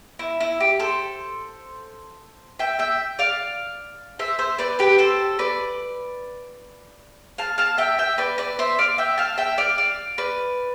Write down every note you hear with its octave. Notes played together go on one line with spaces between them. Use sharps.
E4
E4
G4
A4 C5
E5 G5
E5 G5
D5 F5
C5 E5
C5 E5
B4 D5
G4 B4
A4 C5
B4 D5
F5 A5
F5 A5
E5 G5
E5 G5
B4 D5
B4 D5
C5 E5
D5 F5
E5 G5
F5 A5
E5 G5
D5 F5
D5 F5
B4 D5